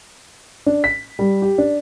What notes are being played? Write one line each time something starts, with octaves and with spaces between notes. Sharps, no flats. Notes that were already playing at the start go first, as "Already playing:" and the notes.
D4
B6
G3
G4
D4